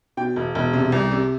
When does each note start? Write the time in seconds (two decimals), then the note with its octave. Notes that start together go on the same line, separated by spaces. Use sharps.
0.17 B2 G5
0.36 E1
0.55 E1
0.73 C3
0.92 C2
1.11 C3